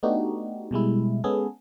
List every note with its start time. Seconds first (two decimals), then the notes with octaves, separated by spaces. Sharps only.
0.03 A3 B3 D4 D#4 F#4 G4
0.71 B2 G3 G#3 E4
1.24 G#3 B3 C#4 G#4 A4